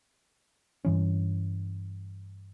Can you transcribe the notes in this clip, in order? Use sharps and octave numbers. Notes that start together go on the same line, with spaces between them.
G2 E3 C#4